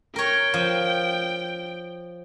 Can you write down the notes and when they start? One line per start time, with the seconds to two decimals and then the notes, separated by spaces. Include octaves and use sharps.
0.16 A#4 C#5 G5
0.54 F3